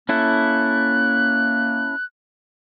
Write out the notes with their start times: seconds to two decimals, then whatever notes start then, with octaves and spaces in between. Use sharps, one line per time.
0.09 A#3 C#4 E4 A4 F#6